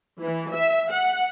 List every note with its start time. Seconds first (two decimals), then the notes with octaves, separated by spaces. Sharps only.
0.20 E3
0.52 E5
0.90 F#5